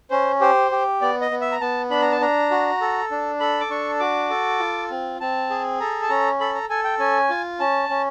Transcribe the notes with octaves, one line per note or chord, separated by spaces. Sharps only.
C#4 C5
G4 C5
G4
B3 D5
D#5
B3
E5
A#5
B3 A5
D4 B5
A#5
A5
D4 A#5
F#4
A4
D4
A4 B5
D6
D4 C#6
F#4 D6
A4
F4
C4
C4 A5
G#4
A4 A#5
A5
C#4 A#5
A4 B5
A#5
A4 G#5
G5
C#4 G#5
F4
C#4 A5
C#4